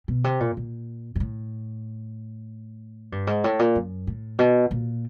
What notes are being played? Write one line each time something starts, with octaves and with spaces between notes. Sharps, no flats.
B2
C3
A#2
A#2
G#2
A2
G2
G#2
A2
A#2
F#2
A2
B2
A#2